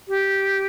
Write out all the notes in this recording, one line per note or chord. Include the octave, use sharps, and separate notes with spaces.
G4